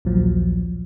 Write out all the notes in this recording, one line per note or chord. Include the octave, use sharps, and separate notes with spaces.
A#1 D#2 A#2 F3 F#3